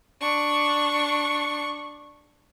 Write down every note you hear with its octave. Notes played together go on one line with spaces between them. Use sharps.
D4 C#6